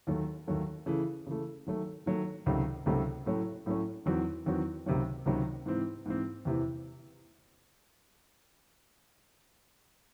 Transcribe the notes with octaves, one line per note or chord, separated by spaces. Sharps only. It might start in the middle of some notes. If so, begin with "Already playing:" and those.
D#2 D#3 F#3 A3
D#2 D#3 F#3 A3
C#3 E3 A3
C#3 E3 A3
D#3 F#3 A3
D#3 F#3 A3
C#2 C3 D#3 F#3 A3
C#2 C3 D#3 F#3 A3
A2 F#3 A3 C#4
A2 F#3 A3 C#4
E2 D#3 F#3 C4 F#4
E2 D#3 F#3 C4 F#4
C#2 C3 D#3 F#3
C#2 C3 D#3 F#3
G#2 E3 C4
G#2 E3 C4
E2 C3 E3